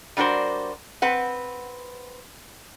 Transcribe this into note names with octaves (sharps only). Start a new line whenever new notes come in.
G3 D4 F#4 A#4 C5
C4 B4 F#5